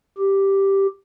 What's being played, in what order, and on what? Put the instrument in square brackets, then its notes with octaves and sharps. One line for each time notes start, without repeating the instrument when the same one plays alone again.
[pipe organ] G4